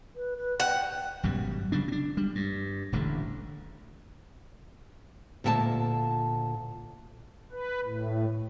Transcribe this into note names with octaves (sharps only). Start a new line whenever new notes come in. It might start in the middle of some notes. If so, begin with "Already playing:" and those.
B4
B4
F#5 G5
G#1 F#2 B2 G3
C#3 F#3 G3 D4
C4 D4
G3
G2
D#1 A1 D3 A3
D2 A#2 E5 G5 A5
B4
A2